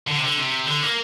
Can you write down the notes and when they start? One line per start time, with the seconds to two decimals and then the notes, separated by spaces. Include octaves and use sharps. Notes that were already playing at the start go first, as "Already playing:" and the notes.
0.08 D3
0.18 C3
0.23 D3
0.37 C3
0.68 D3
0.83 A#3